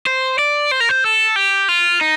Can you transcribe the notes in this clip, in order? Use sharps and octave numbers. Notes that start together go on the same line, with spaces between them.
C5
D5
C5
A#4
C5
A4
G4
F4
D#4